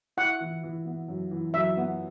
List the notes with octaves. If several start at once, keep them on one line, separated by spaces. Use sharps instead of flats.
E4 F#5
E3
E3
B3
F#2
E3
F#2 E5
B3